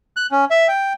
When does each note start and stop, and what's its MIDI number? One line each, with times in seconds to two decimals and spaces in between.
0.17 0.27 90
0.31 0.45 61
0.51 0.67 76
0.68 0.93 79